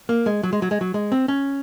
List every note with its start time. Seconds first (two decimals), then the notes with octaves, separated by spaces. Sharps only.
0.09 A#3
0.26 G#3
0.43 F#3
0.53 G#3
0.62 F#3
0.71 G#3
0.81 F#3
0.94 G#3
1.12 C4
1.28 C#4